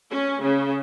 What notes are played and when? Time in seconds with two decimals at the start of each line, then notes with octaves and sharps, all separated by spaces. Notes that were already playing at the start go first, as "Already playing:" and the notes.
0.11 C#4
0.42 C#3